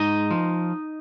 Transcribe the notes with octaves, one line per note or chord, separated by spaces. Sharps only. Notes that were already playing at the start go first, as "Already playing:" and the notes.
Already playing: G#2 D#4 D#5
F3